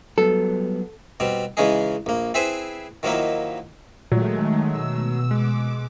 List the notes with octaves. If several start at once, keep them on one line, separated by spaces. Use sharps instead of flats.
F#3 G3 B3 A4
B2 G3 C4
C#3 E3 G#3 C#4 D#4 G#4
A#1 A#3
C4 E4 G#4 B4 C5 G#5
D#3 F3 F#3 A#3 D#4 E4
A#2 D#3 F#3 G#3 A3
B2 E6
G#3 D6